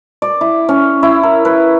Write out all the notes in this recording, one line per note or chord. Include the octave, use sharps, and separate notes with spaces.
D5
E4
C#4
E4
A#4
B4